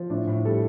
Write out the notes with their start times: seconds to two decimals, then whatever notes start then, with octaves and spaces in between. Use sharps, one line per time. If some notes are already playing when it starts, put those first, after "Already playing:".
Already playing: F3
0.10 A2 D4
0.27 A2
0.45 G3 A4